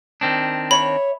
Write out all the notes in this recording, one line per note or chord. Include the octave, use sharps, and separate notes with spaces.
D#3 C4 D4
C#5 E5 B5